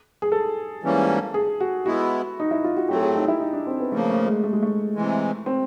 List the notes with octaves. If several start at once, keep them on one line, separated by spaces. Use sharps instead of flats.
G#4
A4
G#2 E3 G3 A#3 C#4
G#4
F#4
G#3 B3 E4 F#4
D#4
E4
F4
F#4
A2 F#3 A3 C4 G4
A4
G#4
D#4
E4
D#4
D4
C4
B3
C#3 F3 A3 A#3
A3
G#3
A3
G#3
A3
C3 E3 G#3
C4